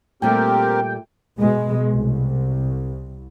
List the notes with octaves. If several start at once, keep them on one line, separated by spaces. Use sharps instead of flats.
A#2 G3 A3 C4 G4 A#4 G5
B2 G#3
C2